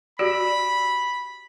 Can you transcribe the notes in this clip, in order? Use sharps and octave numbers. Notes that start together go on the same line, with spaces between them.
F#4 G4 D5 B5